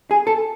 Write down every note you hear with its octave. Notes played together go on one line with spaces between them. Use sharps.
G#4
A4